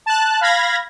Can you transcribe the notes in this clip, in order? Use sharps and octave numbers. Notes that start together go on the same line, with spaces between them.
A5 F#6
F5 B5 G#6 A#6